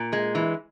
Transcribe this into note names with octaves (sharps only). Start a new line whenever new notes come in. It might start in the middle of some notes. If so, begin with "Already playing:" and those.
Already playing: A#2
G#3
E3